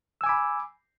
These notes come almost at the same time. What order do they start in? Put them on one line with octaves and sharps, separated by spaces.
E6 G#5 D6 B5